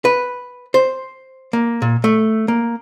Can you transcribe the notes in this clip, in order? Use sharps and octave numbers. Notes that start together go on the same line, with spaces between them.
B4
C5
A#3
A#2
A3
A#3